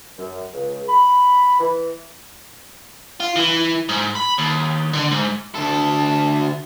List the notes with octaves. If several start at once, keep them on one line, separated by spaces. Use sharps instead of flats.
F#2
C#2
B5
E3
F4
E3
G#2
B5
D#2
D3
G#2
D2 A4